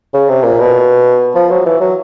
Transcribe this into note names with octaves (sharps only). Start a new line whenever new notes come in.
C#3
C3
A#2
B2
F3
F#3
E3
F#3